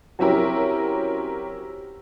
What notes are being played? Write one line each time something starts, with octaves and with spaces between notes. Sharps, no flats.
F#3 C4 C#4 E4 G4 A#4